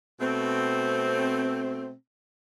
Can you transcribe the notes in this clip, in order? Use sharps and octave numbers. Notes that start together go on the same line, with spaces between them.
B2 A3 C4